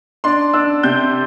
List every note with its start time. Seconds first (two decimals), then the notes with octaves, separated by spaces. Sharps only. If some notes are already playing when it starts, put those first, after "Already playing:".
0.24 D4 C6
0.53 D4 E6
0.83 C3 G6